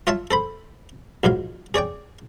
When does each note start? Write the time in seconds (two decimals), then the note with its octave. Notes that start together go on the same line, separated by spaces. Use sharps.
0.07 F4 C#5 E5 F5 A5
0.31 A4 C5 B5
1.23 A#1 G#2 F#3 F5
1.74 G#4 C#5 D5 G5